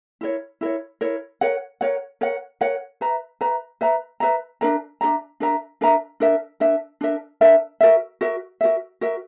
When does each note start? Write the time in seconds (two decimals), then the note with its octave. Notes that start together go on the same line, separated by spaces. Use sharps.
0.21 E4 A#4 C#5
0.61 E4 A#4 C#5
1.01 E4 A#4 C#5
1.41 A#4 C#5 F#5
1.81 A#4 C#5 F#5
2.21 A#4 C#5 F#5
2.61 A#4 C#5 F#5
3.01 B4 E5 A#5
3.41 B4 E5 A#5
3.81 B4 E5 A#5
4.20 B4 E5 A#5
4.61 D4 A#4 E5 A#5
5.01 D4 A#4 E5 A#5
5.40 D4 A#4 E5 A#5
5.81 D4 A#4 E5 A#5
6.20 D4 A#4 E5
6.60 D4 A#4 E5
7.01 D4 A#4 E5
7.41 D4 A#4 E5
7.81 F#4 A#4 E5
8.21 F#4 A#4 E5
8.61 F#4 A#4 E5
9.01 F#4 A#4 E5